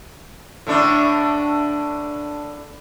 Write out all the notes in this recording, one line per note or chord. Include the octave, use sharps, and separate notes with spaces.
A2 D3 D4